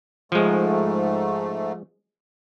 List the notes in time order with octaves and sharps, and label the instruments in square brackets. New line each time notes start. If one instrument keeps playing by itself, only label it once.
[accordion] G#2 A3 [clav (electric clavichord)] F3 G#3